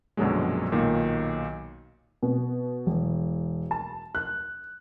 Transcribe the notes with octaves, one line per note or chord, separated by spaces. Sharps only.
A#1 F#2 B2 D3 F#3 G#3
B1 A#2 D#3
B2
E1
A5
F#6